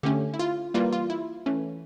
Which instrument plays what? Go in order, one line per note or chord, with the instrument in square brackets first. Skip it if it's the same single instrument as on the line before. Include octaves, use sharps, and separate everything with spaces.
[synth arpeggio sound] D3 A3 C#4 G4
E4
F4
E3 G3 A#3 F4
F4
E4
E3 A3 C#4